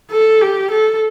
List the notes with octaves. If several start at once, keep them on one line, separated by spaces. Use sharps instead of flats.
A4
G4
A4